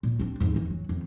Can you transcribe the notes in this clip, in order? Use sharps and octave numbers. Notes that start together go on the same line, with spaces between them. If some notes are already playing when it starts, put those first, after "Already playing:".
A#2
C4 D4
F2 G#2
F2 E3
F#3
F2 D#3